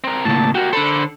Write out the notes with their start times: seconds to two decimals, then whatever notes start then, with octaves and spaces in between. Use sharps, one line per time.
0.04 C4 A#4
0.25 A2 C#3 A#3 A5
0.55 F#4 G4 A#4
0.73 D3 A4 C5 B5